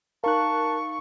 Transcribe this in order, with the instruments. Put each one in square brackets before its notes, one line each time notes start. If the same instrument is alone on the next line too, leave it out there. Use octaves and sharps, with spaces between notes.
[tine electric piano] D#4 F5 [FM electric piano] A#4 F#6 [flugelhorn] A5 [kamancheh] C#6